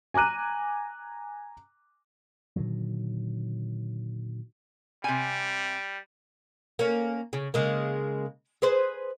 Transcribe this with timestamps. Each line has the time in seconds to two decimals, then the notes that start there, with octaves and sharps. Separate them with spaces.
0.14 G#5 A#5 D6 F#6 D#7
2.56 A#2 D3 D#3 F#3
5.04 C3 G3 G#5
6.79 A#3 C#4
7.33 C#3
7.54 C#3 G#3 A#3
8.62 G#4 B4 C5